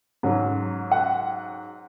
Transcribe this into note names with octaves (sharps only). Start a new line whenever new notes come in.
G#2 F#3 C#4
F#5